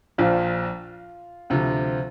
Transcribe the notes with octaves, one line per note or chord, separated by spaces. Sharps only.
A#1 A#2 F3 F4
D2 C3 F3